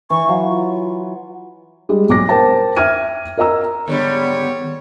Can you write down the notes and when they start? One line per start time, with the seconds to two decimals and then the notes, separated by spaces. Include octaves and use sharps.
0.10 E3 C#6
0.29 F#3 F5
0.49 F4
1.89 G3 G#3 G#4
2.09 B1 D6 A#6
2.29 A#4 C5 G5 A5
2.76 E5 G5 F6 G#6 D#7
3.38 A#4 D#5 A#5 E6
3.88 G#2 D3 D#3 G3 B3 C#5